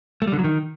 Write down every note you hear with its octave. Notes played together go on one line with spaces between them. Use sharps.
A3
G3
D3
F#3
D#3